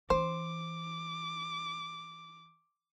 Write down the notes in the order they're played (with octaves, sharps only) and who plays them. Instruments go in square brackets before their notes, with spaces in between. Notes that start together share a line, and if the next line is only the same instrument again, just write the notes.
[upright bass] E3 C#4 [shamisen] C5 [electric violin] D6